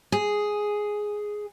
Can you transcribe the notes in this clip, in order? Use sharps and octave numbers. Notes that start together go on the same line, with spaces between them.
G#4